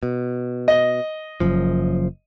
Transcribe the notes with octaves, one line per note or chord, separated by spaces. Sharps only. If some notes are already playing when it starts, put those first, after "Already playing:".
B2
D#5
F#1 F#2 F3